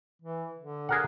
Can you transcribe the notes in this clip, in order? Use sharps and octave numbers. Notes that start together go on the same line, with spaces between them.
E3
D3
G#4 A#4 F#5